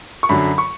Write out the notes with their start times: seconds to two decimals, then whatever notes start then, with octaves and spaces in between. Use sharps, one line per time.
0.23 C#6
0.29 F#2 D3 F#3 B5
0.58 C#6